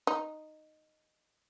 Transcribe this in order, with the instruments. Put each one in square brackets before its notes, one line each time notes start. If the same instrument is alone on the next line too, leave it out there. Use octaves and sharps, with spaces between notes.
[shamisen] D#4